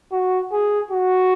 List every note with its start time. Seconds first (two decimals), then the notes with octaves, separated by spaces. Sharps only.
0.12 F#4
0.52 G#4
0.91 F#4